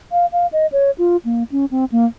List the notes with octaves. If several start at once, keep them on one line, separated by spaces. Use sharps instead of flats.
F5
F5
D#5
C#5
F4
A#3
C#4
C4
A#3